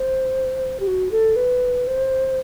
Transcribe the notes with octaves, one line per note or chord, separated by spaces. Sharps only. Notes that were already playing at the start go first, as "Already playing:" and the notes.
Already playing: C5
G4
F#4
A4
B4
C5